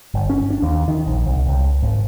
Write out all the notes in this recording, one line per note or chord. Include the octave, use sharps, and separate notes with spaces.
G1
C#4
D4
D#2
D#3
A#1
C2
C#2
G#1